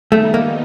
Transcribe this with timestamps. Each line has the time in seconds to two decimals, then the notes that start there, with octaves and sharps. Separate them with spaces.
0.12 D#3 G3 A3 B3 D#4
0.34 A#3